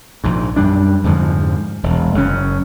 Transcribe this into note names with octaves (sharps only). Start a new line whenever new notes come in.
A#1 G#2
F#2 G3 D4
F2 G#2 D3 F3
E1
F#1 F#3 C#4